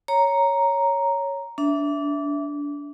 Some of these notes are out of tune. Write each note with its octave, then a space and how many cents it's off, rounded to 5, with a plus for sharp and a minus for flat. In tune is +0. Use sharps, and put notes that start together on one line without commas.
C#5 +0 A#5 +0
D4 -25 E5 +0